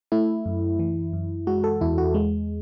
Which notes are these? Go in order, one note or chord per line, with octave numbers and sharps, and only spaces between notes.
A3 E4
F#2
E3
F#2
G#3 F#4
A4
E2 E4
F#4
G#3